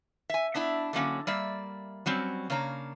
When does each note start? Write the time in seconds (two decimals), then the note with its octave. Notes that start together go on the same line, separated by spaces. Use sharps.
0.30 E5 G#5
0.55 B3 D4 E4 E5
0.93 D3 F#3 A#3 C#4
1.27 G3 A#3 D5 E5
2.06 F#3 G3 C4 C#4
2.50 C#3 A#3 D4 C#5 A#5